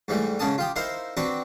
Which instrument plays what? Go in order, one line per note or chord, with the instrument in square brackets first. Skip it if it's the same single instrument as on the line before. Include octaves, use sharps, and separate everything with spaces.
[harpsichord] G#2 E3 G3 A3
G#2 C#3 C#4 A5 D#6
F4 G4 D#6
D#4 E4 A#4 C5 F5
C4 D4 F#4 B4